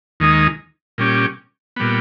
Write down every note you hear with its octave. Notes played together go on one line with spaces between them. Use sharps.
D#2 D#3 G#3 D#4
A#2 G3 C#4 G4
A#2 G3 B3